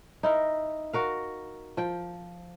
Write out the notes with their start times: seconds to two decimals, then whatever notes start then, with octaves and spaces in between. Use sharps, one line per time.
0.23 D#4 E4 A#4
0.93 F#4 A#4 F5
1.77 F3 G5